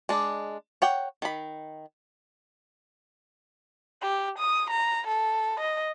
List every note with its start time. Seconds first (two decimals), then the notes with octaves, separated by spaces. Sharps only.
0.09 G#3 D4
0.82 C#5 F#5 G5
1.22 D#3 B5
4.02 G4
4.38 D#6
4.70 A#5
5.07 A4
5.60 D#5